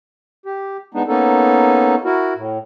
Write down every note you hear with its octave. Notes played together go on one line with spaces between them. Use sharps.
G4
G#3 B3 D4 D#4
A#3 B3 C#4 D#4 A4
E4 F#4 A#4
A2